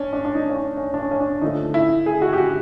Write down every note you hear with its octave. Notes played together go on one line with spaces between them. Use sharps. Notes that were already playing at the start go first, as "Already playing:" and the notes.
Already playing: C#4 D4
D4
D4
D#4
C#4
D4
C#4
D4
C#4
C#4
D4
D3 F3 A3 D#4
E4
G#4
F#4
G4
F#4